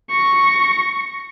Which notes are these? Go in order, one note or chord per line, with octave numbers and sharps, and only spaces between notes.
C#6 A#6